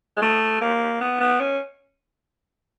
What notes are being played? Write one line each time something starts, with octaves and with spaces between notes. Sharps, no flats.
G#3
A3
A#3
B3
B3
C#4